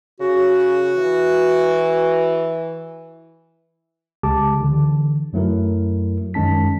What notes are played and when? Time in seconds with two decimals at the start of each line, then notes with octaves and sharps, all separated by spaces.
0.20 C#3 F#4
0.97 E3
4.23 C#2 C#3 G#3 G4 A5 D6
4.61 D3 E3
5.33 F#2 F#3 A3 E4 A#4
6.34 F#2 D#3 G#3 C#4 A5 B6